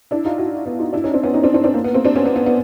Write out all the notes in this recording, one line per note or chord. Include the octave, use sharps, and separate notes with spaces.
D4 E4
D#4 F4
E4 F#4
B3
D#4 F4
D4 E4
C#4 D#4
C4 D4
B3 C#4
C#4 D#4
C4 D4
C4 D4
C4 D4
A#3
B3
A#3 C4
C4 D4
B3 C#4
B3
B3
B3